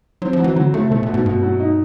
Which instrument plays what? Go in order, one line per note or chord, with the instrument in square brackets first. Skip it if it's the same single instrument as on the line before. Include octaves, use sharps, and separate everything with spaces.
[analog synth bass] F#3 [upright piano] C4
[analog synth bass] F3
[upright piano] F#3
[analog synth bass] E3
[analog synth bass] D3 [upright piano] F#3
[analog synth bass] C#3 [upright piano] A3
[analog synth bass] B2 [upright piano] A3
[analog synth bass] A#2
[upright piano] B2
[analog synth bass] G#2
[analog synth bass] G2 [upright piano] B2
[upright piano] F#3
D#4